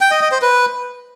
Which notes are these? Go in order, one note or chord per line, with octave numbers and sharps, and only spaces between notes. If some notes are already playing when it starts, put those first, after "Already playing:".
G5
D#5
D#5
C5
B4